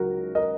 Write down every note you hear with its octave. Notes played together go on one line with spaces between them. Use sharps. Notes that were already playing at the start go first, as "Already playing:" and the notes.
Already playing: C#2 C#3 F#3 F#4 A#4
A#4 D#5